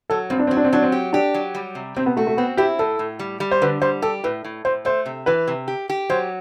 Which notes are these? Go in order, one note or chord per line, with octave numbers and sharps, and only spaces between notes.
F#3 A4
G2 C4
D4
C4
F#3
D4
C4
F#3 D4
C4
G4
D4 G4
F#3
G3
C3
C3 C4
B3
A3 F#4
A3
B3 C4
E4 G4
A2 A4
A2
G3
G3
C5
D3 B4
G3 C5
G4 A4
A2 B4
A2
A2 C5
A3 C5
C3
E3 B4
C3
G4
G4
F#3 C5